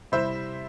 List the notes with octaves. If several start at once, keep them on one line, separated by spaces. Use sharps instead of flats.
C3 G3 C4 E4 C5 E5